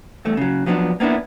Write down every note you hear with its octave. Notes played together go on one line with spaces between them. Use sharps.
E2 G2 A3
C#3 F#3
F3 F#3 B3 C#4 D4
A#3 B3 C#4 D4 E4